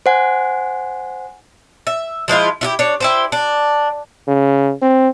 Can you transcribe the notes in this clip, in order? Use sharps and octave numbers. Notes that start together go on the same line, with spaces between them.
C5 F#5 G#5
E5
F3 G#3 E4 F4
E4 F4 G4
D4 C#5
E4 G4 C5
D4
C#3
C4